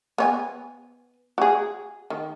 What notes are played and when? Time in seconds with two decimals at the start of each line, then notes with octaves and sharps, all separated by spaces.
0.18 B3 C#5 G#5
1.38 F#4 G#4
2.10 D#3